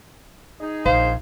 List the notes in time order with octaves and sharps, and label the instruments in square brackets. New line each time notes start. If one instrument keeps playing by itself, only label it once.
[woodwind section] D#4 G#4
[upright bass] A#1 [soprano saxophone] C5 [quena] F5